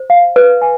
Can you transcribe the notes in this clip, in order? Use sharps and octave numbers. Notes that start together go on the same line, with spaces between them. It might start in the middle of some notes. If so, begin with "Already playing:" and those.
Already playing: C5
F5
B4
G#5